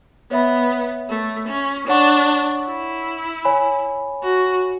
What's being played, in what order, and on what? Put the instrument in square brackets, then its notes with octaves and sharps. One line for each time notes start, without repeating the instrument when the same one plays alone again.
[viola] B3 [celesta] C#5 E5 B5
[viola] A3
C#4
[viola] D4 [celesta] C#5 F#5 C#6
[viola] E4
[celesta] C#5 G#5 B5
[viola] F#4